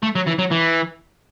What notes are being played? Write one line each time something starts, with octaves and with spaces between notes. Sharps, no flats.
A3
F#3
E3
F#3
E3